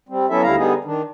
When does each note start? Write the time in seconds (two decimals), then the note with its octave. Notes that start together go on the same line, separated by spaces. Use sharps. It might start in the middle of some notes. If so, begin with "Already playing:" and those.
0.09 G3 C4
0.29 F#3 B3 C#4 E4 A4 E5
0.43 D2 D3 G3 E4 F5 A#5
0.56 D3 G3 B3 D#4 G#4
0.84 D#3 D4